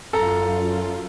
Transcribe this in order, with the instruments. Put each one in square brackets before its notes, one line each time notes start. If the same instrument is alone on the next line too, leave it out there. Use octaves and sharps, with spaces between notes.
[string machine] F#2 F4 [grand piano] A4 A#5